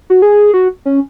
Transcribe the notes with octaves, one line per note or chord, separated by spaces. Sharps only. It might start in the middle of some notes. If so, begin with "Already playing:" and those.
F#4
G#4
F#4
C#4